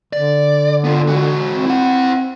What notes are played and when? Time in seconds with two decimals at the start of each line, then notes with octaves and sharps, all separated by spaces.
0.13 D3 D5
0.84 B3 F4
1.08 G#3 F#4
1.51 C4
1.66 E4 F#5